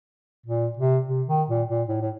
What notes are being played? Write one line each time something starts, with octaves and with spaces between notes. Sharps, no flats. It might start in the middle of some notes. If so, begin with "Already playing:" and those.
A#2
C3
C3
D#3
A#2
A#2
A2
A2